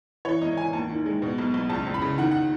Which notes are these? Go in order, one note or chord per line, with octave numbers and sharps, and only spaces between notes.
E3 C#5
G#1 D#5
E3 G#5
D#2 A5
D#3
G#3
B2
B1
B1
C#2 A5
C#2
B5
C#3
D#3 F#5
F#5